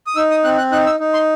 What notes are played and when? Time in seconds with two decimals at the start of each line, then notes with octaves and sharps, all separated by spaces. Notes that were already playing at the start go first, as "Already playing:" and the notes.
0.07 D#6
0.16 D#4 E6
0.31 D#6
0.44 C4 F#6
0.58 F#6
0.72 D#4 F#6
0.86 E6
1.00 D#4
1.14 C6